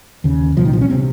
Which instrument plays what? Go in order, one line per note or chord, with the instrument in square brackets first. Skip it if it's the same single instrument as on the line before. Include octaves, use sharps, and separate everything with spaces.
[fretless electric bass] D#2 C#3
C2 A#2 F3
D#3
F3
C#4
C3 C4